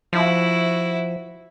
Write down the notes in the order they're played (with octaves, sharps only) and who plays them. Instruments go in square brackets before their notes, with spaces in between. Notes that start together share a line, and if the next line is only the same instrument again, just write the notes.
[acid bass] F3 [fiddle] E4 F#4